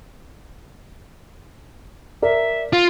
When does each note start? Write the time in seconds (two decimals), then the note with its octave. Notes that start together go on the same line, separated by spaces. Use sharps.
2.22 A#4 D5 E5
2.73 F4